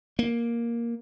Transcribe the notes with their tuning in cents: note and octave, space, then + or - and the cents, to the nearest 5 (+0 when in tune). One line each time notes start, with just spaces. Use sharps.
A#3 +5